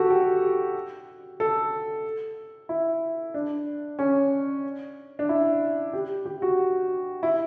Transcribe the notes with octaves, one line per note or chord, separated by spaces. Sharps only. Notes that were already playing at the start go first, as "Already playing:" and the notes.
Already playing: F#4 G4 A4
G4
A4
E4
D4
C#4
D4
E4
G4
G4
F#4
E4